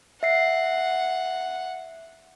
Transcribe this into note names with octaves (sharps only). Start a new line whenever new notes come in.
E5 F#5 C7